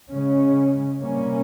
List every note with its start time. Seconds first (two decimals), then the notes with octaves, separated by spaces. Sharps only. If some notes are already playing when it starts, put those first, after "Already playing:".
0.11 C#3 G#3 C#4
0.99 C3 G3 A#3 C#4